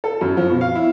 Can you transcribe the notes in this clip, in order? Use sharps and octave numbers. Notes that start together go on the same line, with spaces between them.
A4
F#2
F3
B2
F5
E4